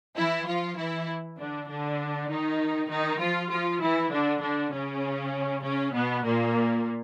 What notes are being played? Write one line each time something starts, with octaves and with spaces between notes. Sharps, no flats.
E3 E4
F3 F4
E3 E4
D3 D4
D3 D4
D#3 D#4
D#3 D#4
F3 F4
F3 F4
E3 E4
D3 D4
D3 D4
C#3 C#4
C#3 C#4
B2 B3
A#2 A#3